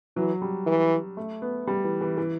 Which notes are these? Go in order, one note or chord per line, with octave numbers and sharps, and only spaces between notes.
E3 F#3
G3
E3
A3
B3
G3
E3
E3
E3